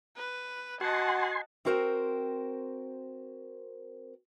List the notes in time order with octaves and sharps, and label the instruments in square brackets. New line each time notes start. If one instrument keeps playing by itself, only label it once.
[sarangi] B4
[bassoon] F#4 [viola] D#5 F#5 [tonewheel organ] G#5 C6 [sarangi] A5
[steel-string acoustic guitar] C4 E4 F#4 A#4 C5 G5